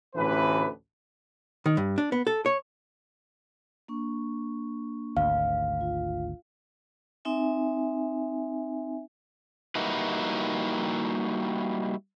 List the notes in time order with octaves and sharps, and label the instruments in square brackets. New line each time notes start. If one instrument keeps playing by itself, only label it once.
[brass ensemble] A1 D2 E3 B4
[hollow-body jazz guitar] D#3
G2
D4
B3
A4
C#5
[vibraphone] A#3 D4 C#6
[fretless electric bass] G#1 D2 [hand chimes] F5
[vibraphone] F4
C4 D#4 E5 G#5
[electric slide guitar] G3 A#3 D#4 E4 F#4 B4